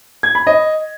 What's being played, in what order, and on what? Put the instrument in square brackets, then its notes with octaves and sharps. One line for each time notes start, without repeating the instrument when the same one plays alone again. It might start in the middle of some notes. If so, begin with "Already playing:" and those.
[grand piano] G#6
B5
D#5